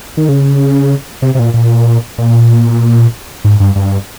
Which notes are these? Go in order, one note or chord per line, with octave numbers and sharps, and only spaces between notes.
D#3
C#3
C3
C3
A#2
A#2
A#2
G#2
G2
G2